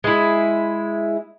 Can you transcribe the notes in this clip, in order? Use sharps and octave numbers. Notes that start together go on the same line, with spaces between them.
G#3 E4